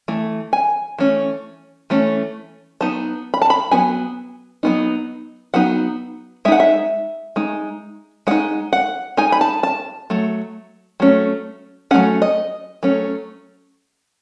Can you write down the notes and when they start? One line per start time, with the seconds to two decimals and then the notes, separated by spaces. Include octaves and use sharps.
0.08 E3 A3
0.53 G#5
0.99 E3 A3 C#4
1.90 E3 A3 C#4
2.81 F#3 B3 D#4 A5
3.34 B5
3.42 A5
3.50 B5
3.71 F#3 B3 D#4 G#5
4.63 F#3 B3 D#4
5.54 F#3 B3 D#4 F#5
6.45 G#3 E5
6.48 D#4 F#5
6.60 E5
7.36 G#3 D#4
8.27 G#3 D#4 F#5
8.73 F#5
9.17 G#3 D#4 G#5
9.32 B5
9.41 A5
9.63 A5
10.10 F#3 A3
11.00 F#3 A3 C#4
11.91 F#3 A3 C#4 F#5
12.22 D#5
12.83 F#3 A3 C#4